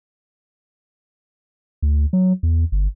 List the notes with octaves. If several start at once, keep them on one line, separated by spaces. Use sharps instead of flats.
D2
F#3
E2
G1